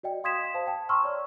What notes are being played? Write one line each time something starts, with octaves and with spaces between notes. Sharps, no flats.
F#4 D5 D#5 G5
F5 C6 D#6 G#6 B6 E7
C5 F5 A5
G5 A5
A5 A#5 C6 C#6 E6 F6
C#5 D5